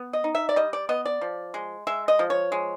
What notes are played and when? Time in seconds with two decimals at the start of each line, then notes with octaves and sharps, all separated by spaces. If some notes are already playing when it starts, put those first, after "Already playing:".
Already playing: B3
0.13 D#5
0.24 D#4
0.35 E5
0.49 D5
0.56 G3 D#5
0.73 D5
0.89 B3 D#5
1.05 D5
1.21 F3
1.54 G#3
1.87 G#3 E5
2.08 D#5
2.19 F3
2.30 C#5
2.52 G#3